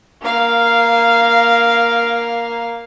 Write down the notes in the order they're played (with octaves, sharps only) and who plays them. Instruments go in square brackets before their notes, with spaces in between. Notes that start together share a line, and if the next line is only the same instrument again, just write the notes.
[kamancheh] A#3 F5